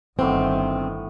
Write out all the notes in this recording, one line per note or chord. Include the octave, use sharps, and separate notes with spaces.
G1 A2 D#3 B3 C4 D6